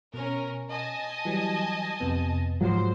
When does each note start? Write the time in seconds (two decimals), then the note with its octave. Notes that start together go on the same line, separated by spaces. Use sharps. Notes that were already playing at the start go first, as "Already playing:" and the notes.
0.14 B2 C#4 A#4
0.69 D#5 G#5 A5
1.25 E3 F#3 G3
2.00 F2 C3 B3
2.61 G#2 F3 F#3 C5